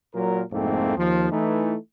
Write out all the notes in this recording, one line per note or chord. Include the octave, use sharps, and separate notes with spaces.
A#2 F#3 A#4
C2 F2 G#2 A3 A#3 C4
D#2 F3
E3 A3 D#4